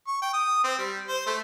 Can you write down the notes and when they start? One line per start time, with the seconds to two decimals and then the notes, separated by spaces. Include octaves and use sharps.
0.07 C#6
0.22 G5
0.33 D#6
0.64 C4
0.78 G3
1.08 C5
1.26 A3